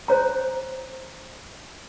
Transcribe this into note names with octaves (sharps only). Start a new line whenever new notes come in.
C5 C#5 A#5